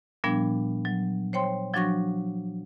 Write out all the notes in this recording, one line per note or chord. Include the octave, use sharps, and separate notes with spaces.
A#2 F3 G3 B3 D4
F#3
C5 C#5 G5 C6
F3 F#3 D4 F#4 C#6 A#6